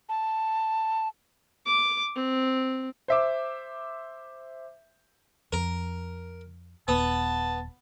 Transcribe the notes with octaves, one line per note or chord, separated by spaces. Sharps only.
A5
D6
C4
C5 E5 D6
F2 A#4
D#1 B3 A5